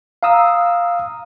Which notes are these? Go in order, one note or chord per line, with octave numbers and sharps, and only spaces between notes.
F5 A#5 D#6 E6